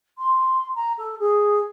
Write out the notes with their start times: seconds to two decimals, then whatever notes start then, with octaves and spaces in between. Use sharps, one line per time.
0.18 C6
0.75 A#5
0.98 A4
1.19 G#4